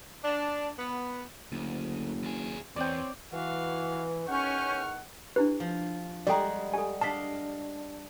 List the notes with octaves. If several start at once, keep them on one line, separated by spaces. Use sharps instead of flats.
D4
B3
F#1 D2
D#2 G#4
E2 C4 C#5 D5 G5
E3 F#4 F5
E2 D#3 C#4 F#5 C#6 F6 G6
D4 E4 G4 B4
F3
G3 G#3 F#4 G4 A4 D5 G5 A#5
G4 A4 G#5
D4 D#5 F5 A5 B6